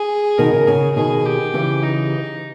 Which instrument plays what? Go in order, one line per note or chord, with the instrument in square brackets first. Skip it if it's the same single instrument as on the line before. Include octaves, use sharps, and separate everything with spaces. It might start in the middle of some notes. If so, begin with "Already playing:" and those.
Already playing: [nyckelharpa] G#4
[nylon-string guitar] B2 D#3 [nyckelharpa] A#4
[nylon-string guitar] C#3
[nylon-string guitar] C#3 [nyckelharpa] G#4
[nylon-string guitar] B2 D#3 [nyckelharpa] G#4
[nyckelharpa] G4
[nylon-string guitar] C#3 E3
[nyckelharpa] D#4